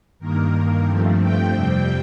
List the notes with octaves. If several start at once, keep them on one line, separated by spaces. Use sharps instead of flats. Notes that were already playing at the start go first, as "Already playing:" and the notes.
G2 D#3 A#3 A#4
G2 F3 A3 C4
G5
F2 C3 G3 C4